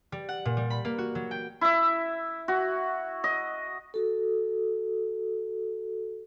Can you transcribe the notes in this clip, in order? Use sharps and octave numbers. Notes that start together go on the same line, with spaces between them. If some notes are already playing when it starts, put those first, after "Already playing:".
G3
F#5
A#2
G3
B5
A#3
F#4
F#3
G5
E4 E5
F#4
D#5
F#4 A4